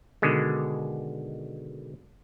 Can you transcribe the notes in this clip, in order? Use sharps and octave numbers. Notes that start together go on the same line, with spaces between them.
B2 D3 D#3 G#3